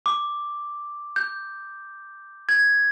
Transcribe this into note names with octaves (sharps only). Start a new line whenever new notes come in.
D6
G6
G#6